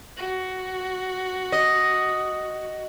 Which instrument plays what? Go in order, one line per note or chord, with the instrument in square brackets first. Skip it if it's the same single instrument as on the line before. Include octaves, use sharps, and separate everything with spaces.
[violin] F#4
[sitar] D#5